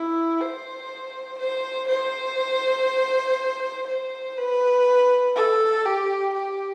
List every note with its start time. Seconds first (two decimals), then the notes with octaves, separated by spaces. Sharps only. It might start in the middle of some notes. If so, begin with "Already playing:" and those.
Already playing: E4
0.40 C5
1.39 C5
1.89 C5
3.87 C5
4.37 B4
5.36 A4
5.86 G4
6.34 G4